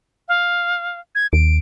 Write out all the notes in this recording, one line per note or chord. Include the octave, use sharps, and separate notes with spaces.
F5
G#6
D#2 D7